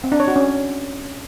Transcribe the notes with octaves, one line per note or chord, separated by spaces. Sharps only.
C4
D4
C#5
F#4
C#4